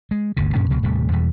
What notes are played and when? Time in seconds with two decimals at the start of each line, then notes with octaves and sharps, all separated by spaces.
0.11 G#3
0.37 G1 D2 C#3
0.55 F#2 A#2 C#4
0.70 C#2 B2 F#3
0.83 D#1 A2 C3 G3
1.12 E2 B2 E3 G3